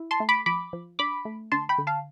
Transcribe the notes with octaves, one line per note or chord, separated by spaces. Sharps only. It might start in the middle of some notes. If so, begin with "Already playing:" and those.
Already playing: E4
A5 C6
A3
B5 D6
F3 B5 D6
F3
D4 B5 D6
A3
D3 A5 C6
G5 B5
D3
F5 A5